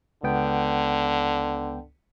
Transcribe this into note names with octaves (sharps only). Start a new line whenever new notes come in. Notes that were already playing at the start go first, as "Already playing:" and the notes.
C#2 D3 B3 G5